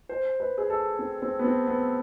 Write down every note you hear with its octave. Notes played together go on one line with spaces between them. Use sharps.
C5
B4
G#4
A4
C4
C4
B3
C4
B3